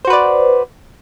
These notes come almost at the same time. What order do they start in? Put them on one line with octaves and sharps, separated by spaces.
C5 F#4 B4 D5